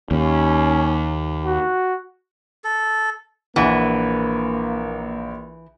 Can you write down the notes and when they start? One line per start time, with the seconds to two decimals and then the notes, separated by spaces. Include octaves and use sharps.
0.11 D#2 C#4
1.46 F#4
2.64 A4
3.56 A#1 E3 A#3 F#5